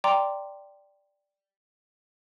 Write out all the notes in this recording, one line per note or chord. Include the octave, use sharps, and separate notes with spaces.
D5 G5 A#5 C6 D6